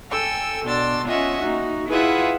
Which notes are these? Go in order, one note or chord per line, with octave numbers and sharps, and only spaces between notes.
A4 G5 G#5 E6
B2 D4 C6 E6 A6
C#4 F4 D#5 E5 F#5 G#5
A#3 D#4 F#4
E4 F4 G#4 B4 E5 F#5